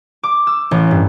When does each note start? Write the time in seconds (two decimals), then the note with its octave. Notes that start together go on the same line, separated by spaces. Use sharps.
0.23 D6
0.47 E6
0.71 A1
0.91 G2